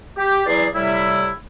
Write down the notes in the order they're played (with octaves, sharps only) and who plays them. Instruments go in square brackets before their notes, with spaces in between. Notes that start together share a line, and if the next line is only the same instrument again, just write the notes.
[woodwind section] G4
E2 F#3 E4 G#4 D5 C6
A2 C3 G3 E4